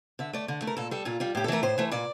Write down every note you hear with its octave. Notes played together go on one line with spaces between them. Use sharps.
D3 E5
A3 D5
D3
A3
A#4
A#2 A4
G3 A4
A#2 F4
G3 F4
A2 G4
A4
E3 A3 A#4
A2 C5
E3 A3
A#2 D5